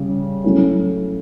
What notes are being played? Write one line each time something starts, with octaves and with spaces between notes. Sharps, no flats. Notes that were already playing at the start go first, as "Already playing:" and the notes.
Already playing: C#3 G3
F#3 A3 C#4 E4